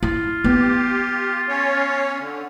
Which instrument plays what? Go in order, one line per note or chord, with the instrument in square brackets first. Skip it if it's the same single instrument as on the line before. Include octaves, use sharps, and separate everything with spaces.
[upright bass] E4 [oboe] F4
[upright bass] B3 [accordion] G4
[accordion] C#4 C#5
D3